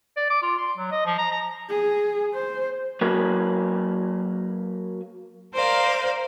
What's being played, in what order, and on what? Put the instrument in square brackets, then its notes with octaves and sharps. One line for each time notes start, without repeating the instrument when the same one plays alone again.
[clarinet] D5
D6
F4
C6
F#3
D#5
F3
A#5
A#5
[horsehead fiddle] G#4
C5
[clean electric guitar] F#3 A#3 B4 C#5
[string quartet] A#4 C5 D5 F5